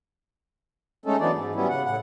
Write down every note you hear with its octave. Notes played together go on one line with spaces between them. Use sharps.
G#3 A3 C#4 D#4 A4
E3 F#3 B3 D4 D#4 D5
G#2
F#3 G3 B3 C#4 E4
C#3 F#5
A2 F#5